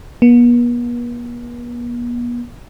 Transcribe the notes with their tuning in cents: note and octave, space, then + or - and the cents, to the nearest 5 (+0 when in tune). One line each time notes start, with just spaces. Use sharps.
B3 -45